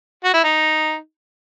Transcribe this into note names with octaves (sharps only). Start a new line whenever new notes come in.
F#4
E4
D#4